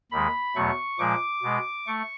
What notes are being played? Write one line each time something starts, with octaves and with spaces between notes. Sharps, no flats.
D#2 D#3 G#3 B5
E2 B2 F#3 A3 C#6
A#2 F3 G#3 D6
B2 G#3
A3 C#6